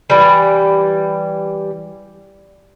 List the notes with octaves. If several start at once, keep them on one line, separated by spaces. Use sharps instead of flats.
E3 G3